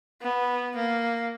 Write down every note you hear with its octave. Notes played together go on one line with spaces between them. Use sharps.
B3
A#3